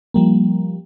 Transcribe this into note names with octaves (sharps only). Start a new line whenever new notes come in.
F3 G3 A#3